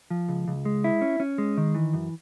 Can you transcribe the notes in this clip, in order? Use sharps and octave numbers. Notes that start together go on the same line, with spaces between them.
F3
C#2
C#2
G#3
E4
C#4
C#4
G#3
D#3
E3
F#2